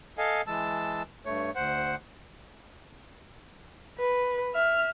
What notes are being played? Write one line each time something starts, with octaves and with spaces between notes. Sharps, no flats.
A4 D#5 F5 G#5
E3 G#3 A5 E6
G2 A3 C#5
D2 C5 F#5
B4
E5 F6